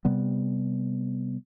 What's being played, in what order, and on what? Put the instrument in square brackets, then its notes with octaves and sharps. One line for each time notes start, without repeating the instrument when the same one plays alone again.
[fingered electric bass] C3 G3 B3